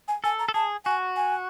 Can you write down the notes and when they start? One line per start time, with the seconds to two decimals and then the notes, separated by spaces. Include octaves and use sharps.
0.08 G#5
0.24 A4 G#5
0.39 A#5
0.48 A4
0.54 G#4 A5
0.85 F#4 G#5
1.16 G#5